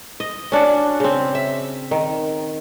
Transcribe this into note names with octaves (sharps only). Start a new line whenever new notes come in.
D#5
C#4 D4 F#4
C#3 C4
E5
D#3